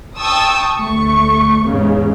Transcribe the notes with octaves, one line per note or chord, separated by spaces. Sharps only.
G5 A5 C#6 D#6 E6
D2 A3 C#6
E2 G#2 C#3